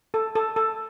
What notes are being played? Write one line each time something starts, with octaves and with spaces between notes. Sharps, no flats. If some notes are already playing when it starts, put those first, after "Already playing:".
A4
A4
A4